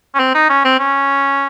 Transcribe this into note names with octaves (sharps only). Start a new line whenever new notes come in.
C#4
C4
D#4
C#4
C4
C#4